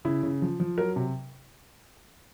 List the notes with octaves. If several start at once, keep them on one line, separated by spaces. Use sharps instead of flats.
C#3 E4
C#3
F3
F3
F#3 A#4
C3